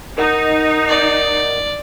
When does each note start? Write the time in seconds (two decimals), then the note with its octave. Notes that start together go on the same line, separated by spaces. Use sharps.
0.18 D#4 A#4 D#5 F#5
0.88 D5